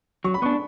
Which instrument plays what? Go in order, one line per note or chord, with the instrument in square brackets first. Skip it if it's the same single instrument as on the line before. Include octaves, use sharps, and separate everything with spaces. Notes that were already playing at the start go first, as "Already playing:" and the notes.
[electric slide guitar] F#3 [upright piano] C#6
[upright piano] B5
[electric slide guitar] B3 [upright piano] C#6
[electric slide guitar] D4